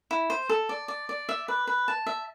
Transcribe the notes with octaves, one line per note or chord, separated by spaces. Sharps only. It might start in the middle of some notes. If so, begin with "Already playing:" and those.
E4
C5
A4
D5
D5
D5
E5
B4
B4
A5
E5